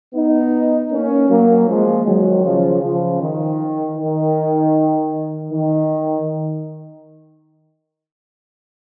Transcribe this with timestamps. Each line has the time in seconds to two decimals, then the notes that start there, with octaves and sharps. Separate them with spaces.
0.14 B3 D#4
0.91 A#3 C#4
1.29 F#3 A#3
1.67 F3 G#3
2.06 D#3 F#3
2.44 C#3 F3
2.82 C#3 F3
3.20 D#3
3.98 D#3
5.51 D#3